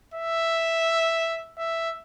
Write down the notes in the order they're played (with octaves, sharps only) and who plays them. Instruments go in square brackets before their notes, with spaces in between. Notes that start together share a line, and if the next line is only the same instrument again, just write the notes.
[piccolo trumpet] E5
E5